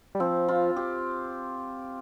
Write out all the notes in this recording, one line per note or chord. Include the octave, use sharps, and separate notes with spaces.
G3
F3 C4
F4
G4